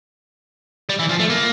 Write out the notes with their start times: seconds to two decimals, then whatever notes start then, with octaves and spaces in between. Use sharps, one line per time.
0.90 G3
0.99 E3
1.10 F3
1.20 A3
1.30 A#3